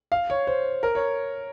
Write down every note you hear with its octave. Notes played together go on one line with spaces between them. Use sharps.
F5
C#5
C5
A#4
C#5